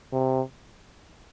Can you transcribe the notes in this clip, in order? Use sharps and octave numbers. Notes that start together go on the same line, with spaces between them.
C3